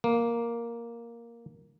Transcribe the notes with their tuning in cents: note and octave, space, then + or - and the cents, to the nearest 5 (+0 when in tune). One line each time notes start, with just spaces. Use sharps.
A#3 +5